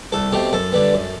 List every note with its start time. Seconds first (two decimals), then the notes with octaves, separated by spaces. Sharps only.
0.12 C2 A4
0.32 B2 A3 C4 G4
0.53 F#2 A4
0.73 D3 G3 B3
0.93 F#2